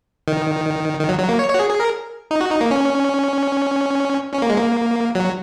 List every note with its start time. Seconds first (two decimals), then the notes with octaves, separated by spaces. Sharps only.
0.28 D#3
0.99 D#3
1.09 F#3
1.19 F#3
1.29 A#3
1.39 C#5
1.50 C#5
1.54 F#4
1.59 G#4
1.70 G#4
1.80 A#4
2.31 D#4
2.41 F#4
2.51 D#4
2.61 A#3
2.71 C#4
4.33 C#4
4.42 A#3
4.50 G#3
4.58 A#3
5.15 F#3